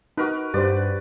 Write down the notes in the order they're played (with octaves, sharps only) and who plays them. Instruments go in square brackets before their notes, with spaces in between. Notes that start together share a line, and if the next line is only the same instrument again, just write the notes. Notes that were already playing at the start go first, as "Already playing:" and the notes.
[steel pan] D#4 [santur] F#4 A#4 B4
[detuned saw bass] G2 [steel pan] G4 C5 [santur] B4 D5